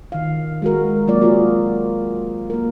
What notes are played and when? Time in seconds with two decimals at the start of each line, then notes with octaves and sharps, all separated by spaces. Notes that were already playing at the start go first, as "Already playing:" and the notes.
0.12 D#3 F5
0.62 G#3 F#4 A#4
1.07 F#3 A#3 F4 D5
1.21 A#3 C4 F4 F#4 G#4 A#4
2.50 A#3 A#4